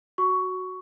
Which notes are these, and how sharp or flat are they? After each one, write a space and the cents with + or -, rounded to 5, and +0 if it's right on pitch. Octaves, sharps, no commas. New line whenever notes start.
F#4 +0 C#6 +10